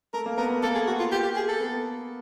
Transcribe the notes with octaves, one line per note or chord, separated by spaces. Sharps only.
A3 A#4
A#3
B3 A#4
A3
A#3 A4
G#4
F#4
F4
G4
G4
G#4
A4
B3